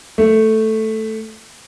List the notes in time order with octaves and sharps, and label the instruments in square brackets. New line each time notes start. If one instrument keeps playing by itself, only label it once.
[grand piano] A3